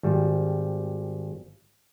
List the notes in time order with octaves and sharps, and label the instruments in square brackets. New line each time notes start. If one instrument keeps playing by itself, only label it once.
[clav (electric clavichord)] G#1 G3